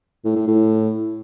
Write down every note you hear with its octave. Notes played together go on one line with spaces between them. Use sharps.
A2
A2
A2